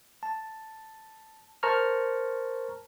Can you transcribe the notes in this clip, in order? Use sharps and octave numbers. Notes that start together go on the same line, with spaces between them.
A5
A#4 C5 A5 A#5 C#6 F6